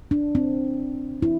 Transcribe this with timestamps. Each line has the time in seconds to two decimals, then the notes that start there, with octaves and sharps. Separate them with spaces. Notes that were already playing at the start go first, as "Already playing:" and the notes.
0.11 D4
0.35 C4
1.22 E4